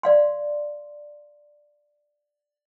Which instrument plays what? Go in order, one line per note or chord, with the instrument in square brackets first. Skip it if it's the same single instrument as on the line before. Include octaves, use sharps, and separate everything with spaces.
[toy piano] D5 F5 C6